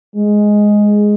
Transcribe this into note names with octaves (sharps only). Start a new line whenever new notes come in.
G#3